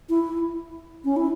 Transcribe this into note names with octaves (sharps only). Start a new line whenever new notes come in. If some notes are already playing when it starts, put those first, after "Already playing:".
E4
C#4
E4